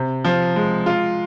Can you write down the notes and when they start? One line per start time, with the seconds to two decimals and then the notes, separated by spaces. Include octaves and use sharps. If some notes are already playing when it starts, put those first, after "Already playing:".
Already playing: C3
0.25 F3
0.56 G#3
0.86 F4